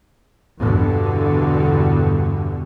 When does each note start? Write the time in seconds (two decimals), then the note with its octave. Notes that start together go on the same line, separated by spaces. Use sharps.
0.59 E2 G2 B2 D3